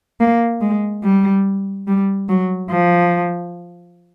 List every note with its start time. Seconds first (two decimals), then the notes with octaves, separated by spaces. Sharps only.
0.20 A#3
0.61 G#3
1.03 G3
1.87 G3
2.29 F#3
2.70 F3